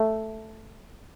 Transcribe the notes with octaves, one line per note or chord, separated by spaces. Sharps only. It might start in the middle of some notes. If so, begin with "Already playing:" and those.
Already playing: A3